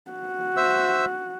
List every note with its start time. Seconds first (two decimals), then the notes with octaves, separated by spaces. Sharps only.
0.11 F#4
0.57 C5 E5 E6